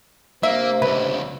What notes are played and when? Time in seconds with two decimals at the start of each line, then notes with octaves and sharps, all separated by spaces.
0.43 C3 A#3 D4 C5 E5
0.82 C#2 D3 B4